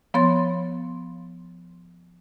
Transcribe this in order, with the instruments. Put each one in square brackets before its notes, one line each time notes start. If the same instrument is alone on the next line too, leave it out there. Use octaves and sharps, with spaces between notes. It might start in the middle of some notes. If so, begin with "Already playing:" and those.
[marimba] F3 B3 C#5 B5 C6 A6